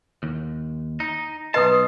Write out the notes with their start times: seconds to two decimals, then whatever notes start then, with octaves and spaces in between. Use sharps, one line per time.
0.23 D#2
1.00 D#4
1.54 B1 B2 B4 D#5 A5 C6 D#6